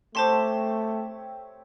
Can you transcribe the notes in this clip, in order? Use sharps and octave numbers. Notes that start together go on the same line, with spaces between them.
A3 C4 G4 C5 C#5 A5 C6